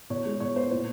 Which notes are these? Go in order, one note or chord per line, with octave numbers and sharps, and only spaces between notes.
B2 C#5
G#3
B2 C#5
B3 C5
A#2 C5